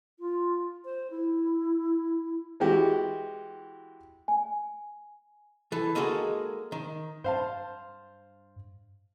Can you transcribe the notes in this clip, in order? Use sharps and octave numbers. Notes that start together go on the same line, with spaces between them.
F4
C5
E4
E3 G#3 F#4 G4
G#5
E3 A4
G#3 A#3 D#4 F#4 G#4 A4
D#3
G2 C5 F5 A5